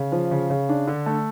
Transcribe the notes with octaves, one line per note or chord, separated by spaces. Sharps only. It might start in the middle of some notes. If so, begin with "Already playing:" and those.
Already playing: C#3
F3
C#3
C#3
D4
D3
A3